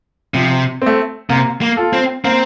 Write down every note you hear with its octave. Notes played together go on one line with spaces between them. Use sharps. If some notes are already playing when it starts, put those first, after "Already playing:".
C3 F3
A3 C4
C3 A#3
A#3
F4 A4
C4
A#3 C4